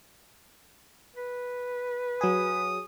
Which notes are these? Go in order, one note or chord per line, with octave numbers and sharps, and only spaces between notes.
B4
F#3 G#4 D#6